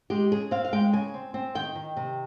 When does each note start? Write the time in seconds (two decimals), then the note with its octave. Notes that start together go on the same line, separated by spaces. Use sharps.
0.10 G#3 G4
0.31 C#3 G#4
0.51 C4 F5
0.65 F5
0.73 G#3 G5
0.93 C#3 G#5
1.14 C4
1.34 C4
1.55 D#3 G5
1.75 D#3
1.96 C3